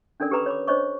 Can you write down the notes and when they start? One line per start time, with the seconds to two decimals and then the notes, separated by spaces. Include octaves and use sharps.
0.20 C#4 D4 A4 A#4 D5
0.31 G4 A4 B4 A#5 B5 D6
0.46 C#5 B5 D6
0.67 D4 C5 C#5 D#5 C#6 D6